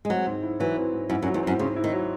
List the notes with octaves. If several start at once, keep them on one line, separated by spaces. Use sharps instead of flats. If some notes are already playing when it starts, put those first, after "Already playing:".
G#3
F#3 C4
G#2
E4
E3 F#3
C4
G#2
F#2 E4
F#2
F#3
E2
F#2 C4
G#2 C#3
E4
D#3
F#3